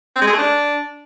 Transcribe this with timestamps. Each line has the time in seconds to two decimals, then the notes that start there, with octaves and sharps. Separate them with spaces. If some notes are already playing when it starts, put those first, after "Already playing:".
0.16 C4
0.22 G#3
0.27 G#4
0.33 A3
0.38 D4